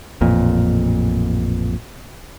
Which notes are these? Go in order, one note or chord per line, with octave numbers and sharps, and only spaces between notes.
A1 F2 A#2